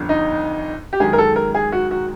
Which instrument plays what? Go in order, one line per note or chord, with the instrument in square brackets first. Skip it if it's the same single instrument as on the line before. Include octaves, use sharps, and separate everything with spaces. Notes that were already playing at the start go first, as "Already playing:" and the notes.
Already playing: [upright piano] G1 F2 D3
D#4
G4
F#2 D#3 G#3 G#4
A#4
A4
A#4
G#4
F#4
F#4